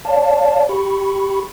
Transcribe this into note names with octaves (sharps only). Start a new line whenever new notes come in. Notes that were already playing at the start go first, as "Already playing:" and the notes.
C#5 D5 F5 A5
G4 B5 C#6